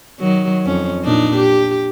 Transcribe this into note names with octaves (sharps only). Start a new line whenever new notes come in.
D#3 F#3
F2 C#4
A#2 D4 D#4
G4